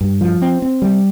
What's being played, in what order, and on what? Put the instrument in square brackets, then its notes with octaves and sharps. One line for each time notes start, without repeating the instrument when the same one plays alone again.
[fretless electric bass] G2
F3
C4
C4
G3